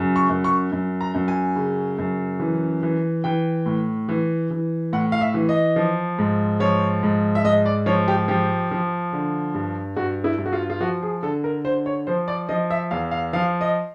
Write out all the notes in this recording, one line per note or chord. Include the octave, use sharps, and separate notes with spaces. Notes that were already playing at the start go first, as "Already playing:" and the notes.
Already playing: F#2 C#3
C#6
F#2
C#6
F#2
A#5
F#2
G#5
C#3
F#2
E3
E3
E3 G5
A2
E3
E3
A2 F#5
F5
E5
E3
D#5
F3
G#2
F3 C#5
G#2
E5
G#2 D#5
D5
F3 C#5
G4
F3 G4
F3
D3
G2
G2 F#4
E4
G2
F#4
F4
F4
F3 F#4
G#4
D3 A4
A#4
D3 C5
C#5
F3 C5
D5
F3 D#5
E5
E2 F5
F5
F3 F5
D#5